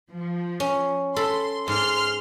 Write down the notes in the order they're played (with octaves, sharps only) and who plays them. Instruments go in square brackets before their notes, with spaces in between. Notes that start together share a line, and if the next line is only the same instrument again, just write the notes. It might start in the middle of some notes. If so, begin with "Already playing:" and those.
[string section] F3
[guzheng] C#4
[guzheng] A4 B5 [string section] C6
[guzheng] G#2 [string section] C6 F6